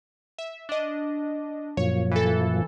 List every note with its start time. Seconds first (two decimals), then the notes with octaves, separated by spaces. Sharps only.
0.38 E5
0.69 D4 D#5
1.77 F#2 A#2 F3 C#5
2.12 E3 A4